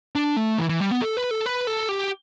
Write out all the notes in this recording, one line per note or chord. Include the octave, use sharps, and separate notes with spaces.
D4
A3
E3
E3
G3
B3
A4
B4
A4
B4
A4
G4